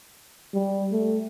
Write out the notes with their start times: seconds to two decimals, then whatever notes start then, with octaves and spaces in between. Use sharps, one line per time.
0.54 G3
0.93 A3